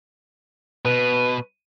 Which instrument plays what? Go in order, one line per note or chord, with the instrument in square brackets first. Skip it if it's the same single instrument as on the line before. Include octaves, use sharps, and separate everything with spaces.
[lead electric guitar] B2 [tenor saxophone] B4